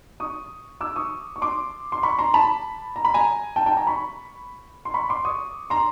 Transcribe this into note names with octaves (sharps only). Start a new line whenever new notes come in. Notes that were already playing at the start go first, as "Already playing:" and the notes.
C#6 D#6
D6 E6
C#6 D#6
C#6
C6 D6
C6
B5 C#6
A#5 C6
A5 B5
A#5
B5
G#5 A#5
G5 A5
G5 A5
G#5 A#5
B5 C#6
C6
B5 C#6
C6 D6
C#6 D#6
A#5 C6